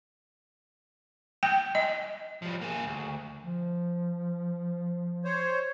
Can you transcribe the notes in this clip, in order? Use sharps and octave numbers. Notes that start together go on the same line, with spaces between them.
G5
D#5
F3 G3
A#3 G#4
D2
F3
C5 C#5